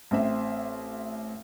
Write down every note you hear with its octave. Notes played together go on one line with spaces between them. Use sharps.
A1 C4 E5